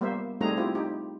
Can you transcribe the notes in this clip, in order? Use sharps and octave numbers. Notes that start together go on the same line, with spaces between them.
G3 A#3 B3 C5 E5
G3 A3 C4 D#4 G#4 A#5
C4 E4 F4 G4
D#4 G4